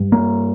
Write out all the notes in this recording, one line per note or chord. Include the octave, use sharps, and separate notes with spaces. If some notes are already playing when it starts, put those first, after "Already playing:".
Already playing: G2
A#3